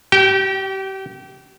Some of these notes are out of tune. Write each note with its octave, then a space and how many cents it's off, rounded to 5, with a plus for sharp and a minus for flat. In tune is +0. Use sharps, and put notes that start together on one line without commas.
G4 -30 G5 +0